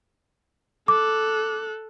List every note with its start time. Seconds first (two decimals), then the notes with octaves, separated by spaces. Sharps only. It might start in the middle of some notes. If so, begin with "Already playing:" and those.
0.88 A4 D6 F#6